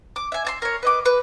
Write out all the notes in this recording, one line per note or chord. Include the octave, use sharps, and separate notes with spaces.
D6
E5 G#5
E5 A5 C6
A#4 C#5
B4 D#5 D6
B4